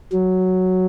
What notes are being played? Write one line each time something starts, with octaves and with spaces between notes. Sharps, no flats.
F#3